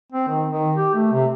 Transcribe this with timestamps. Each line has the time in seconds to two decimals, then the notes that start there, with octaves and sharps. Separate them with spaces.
0.12 C4
0.28 D#3
0.50 D#3
0.76 G4
0.95 A3
1.12 C3